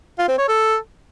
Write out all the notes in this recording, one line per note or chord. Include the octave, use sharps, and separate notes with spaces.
F4
C4
C#5
A4